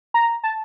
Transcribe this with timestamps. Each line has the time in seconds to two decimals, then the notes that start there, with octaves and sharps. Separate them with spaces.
0.14 A#5
0.44 A5